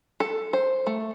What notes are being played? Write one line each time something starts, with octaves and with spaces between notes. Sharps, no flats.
A4
C5
A3